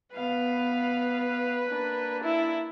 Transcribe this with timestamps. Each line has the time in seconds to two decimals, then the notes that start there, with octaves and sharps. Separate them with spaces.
0.15 B3 B4 F5
1.66 A#3 D4
2.24 E4